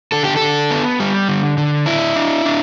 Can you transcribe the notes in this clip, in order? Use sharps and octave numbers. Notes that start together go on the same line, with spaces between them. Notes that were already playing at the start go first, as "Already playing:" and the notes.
D3 A4
G4
A4
D3
B3
G3
D3
D3
D4 E4
D4
D4